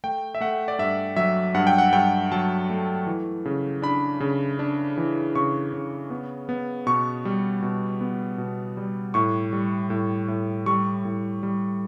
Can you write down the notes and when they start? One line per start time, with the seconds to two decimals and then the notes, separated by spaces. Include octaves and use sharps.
0.04 A3 G5
0.35 E5
0.41 A3 F#5
0.68 D5
0.79 G2 E5
1.16 F#3 E5
1.54 G2 F#5
1.67 G5
1.78 F#5
1.92 G2 G5
2.32 F#3 A5
2.70 A3
3.06 E3
3.45 C#3
3.82 D4 B5
4.20 C#3
4.59 D4
4.97 E3
5.35 C#3 C#6
5.73 C#3
6.10 B3
6.49 B3
6.86 B2 C#6
7.25 G3
7.62 B2
8.01 B3
8.38 B2
8.77 G3
9.14 A2 C#6
9.53 G3
9.90 A2
10.28 A2
10.66 G3 C#6
11.05 A2
11.43 G3